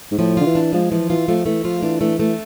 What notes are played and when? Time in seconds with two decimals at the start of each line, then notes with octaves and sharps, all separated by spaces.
0.11 G#2
0.19 A2 F3
0.37 D3 F4
0.46 E3
0.55 D4
0.73 F3 G#3
0.91 E3 F3
1.10 E3 F4
1.28 F3 A3
1.46 E3 A3
1.64 F3 F4
1.83 E3 D4
2.01 E3 A3
2.19 E3 A3